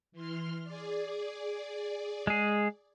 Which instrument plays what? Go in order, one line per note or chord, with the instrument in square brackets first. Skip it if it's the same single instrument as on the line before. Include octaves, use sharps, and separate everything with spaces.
[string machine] E3 C6 F6
G#4 D5
[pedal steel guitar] G#3 G#4